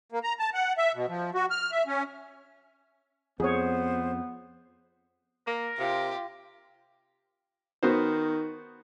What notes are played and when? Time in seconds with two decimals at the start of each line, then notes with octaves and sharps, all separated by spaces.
0.12 A#3
0.24 A#5
0.39 A5
0.54 F#5
0.78 E5
0.95 B2
1.09 F3
1.34 F#4
1.51 F6
1.72 E5
1.87 C#4
3.40 F2 B3 G#4 C5 C#5
5.47 A#3 A#4
5.79 C3 F4 G4
7.83 D#3 B3 F#4 C5